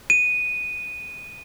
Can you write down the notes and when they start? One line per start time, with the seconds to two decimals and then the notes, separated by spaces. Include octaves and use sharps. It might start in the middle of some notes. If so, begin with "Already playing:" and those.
0.10 D#7